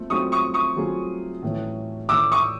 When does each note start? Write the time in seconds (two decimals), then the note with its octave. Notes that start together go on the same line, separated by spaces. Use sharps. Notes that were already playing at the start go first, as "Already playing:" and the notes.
Already playing: A3 C4 F4
0.10 F#3 A3 C4 F4 G#4 C#6 D#6
0.32 C#6 D#6
0.54 C#6 D#6
0.76 F#3 A3 C4 F4 G#4
1.42 A2 E3 A3 C#4
2.09 A2 E3 A3 C#4 D6 E6
2.32 C#6 D#6